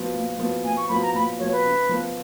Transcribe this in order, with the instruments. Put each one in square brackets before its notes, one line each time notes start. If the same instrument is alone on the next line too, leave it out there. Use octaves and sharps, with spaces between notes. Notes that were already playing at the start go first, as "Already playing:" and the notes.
Already playing: [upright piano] A#2 F3 B3 F#4
A#2
F3 B3 F#4
[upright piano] A#2 [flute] G#5
[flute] C#6
[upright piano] F3 B3 F#4 [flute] B5
[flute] A#5
[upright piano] A#2 [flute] B5
[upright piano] F3 B3 F#4 [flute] C#5
[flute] B4
[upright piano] C#3
F3 B3